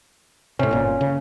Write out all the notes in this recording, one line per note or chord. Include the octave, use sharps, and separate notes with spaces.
A2 C3 C#4
G1 A#2
C#3